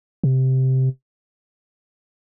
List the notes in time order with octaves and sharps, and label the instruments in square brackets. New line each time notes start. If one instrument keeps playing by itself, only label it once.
[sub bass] C3